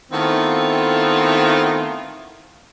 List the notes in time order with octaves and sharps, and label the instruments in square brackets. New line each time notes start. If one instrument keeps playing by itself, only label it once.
[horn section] D#3 A3 B3 C4 E4 F4